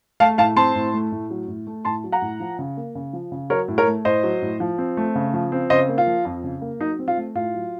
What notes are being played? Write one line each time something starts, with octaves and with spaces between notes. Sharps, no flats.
A3 F5 A5
A2 F5 A5
C4 A5 C6
A2
A3
A2
F#3
A2
A3
A2 A5 C6
F#3
F#5 A#5
A2
F3
C#3
A#3
C#3
F3
C#3
F#3 A#4 C#5
A2
A#4 C#5
A3
A2 C5 D#5
F#3
A2
F3
C4
A3
C#3
F3
C4
C#3 C5 D#5
A#3
F4
F3
F2
C#3
A#3
F#3 D#4
C4
F4
A3
A2 F4
F#3